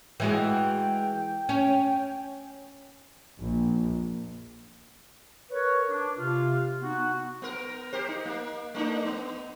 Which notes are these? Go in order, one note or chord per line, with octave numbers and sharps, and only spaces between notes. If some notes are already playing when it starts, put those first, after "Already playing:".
E3 G#3 F#4 G5
C#4
A#1
A#4 B4 C#5
D4
C3 F4
B3 D#4 F#4
B3 A#4
G4 A#4 C5
D#4
A#3
A3 D4 D#4
B3